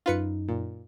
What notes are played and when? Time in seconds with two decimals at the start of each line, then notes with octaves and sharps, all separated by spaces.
0.06 F#2 D#4 F4 B4 C#7
0.48 A#2